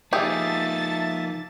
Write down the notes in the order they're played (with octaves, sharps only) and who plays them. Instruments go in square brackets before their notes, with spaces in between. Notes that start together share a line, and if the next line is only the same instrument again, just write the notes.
[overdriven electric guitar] F3 D#4 [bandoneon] A#3 E5 [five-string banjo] G4 G#4 [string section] A5 A6